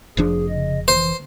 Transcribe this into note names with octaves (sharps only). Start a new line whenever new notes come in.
F1 F3 D4 G#4
C#3 D#5
E3 C5